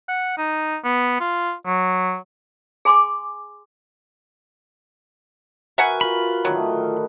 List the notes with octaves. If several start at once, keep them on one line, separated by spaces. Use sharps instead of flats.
F#5
D#4
B3
F4
F#3
G#4 G#5 C6 D6
F#4 A#4 B4 E5 F#5 G#5
F4 B5
A2 D3 D#3 F#3